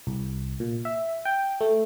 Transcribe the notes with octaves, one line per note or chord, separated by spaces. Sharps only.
C2
A#2
E5
G5
A3